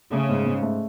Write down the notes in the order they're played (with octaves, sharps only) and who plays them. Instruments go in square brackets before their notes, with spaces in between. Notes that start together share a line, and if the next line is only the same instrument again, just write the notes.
[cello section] C#3 [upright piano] A3
[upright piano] G#2
G#2
A3